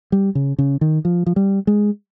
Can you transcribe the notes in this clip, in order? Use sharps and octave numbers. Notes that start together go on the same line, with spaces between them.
G3
C#3
C#3
D#3
F3
F3
G3
G#3